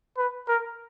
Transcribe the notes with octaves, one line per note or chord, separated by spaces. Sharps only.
B4
A#4